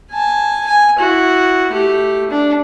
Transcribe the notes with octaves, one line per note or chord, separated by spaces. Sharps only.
G#5 A5
G#5
E4 F#4
A3 G4
D4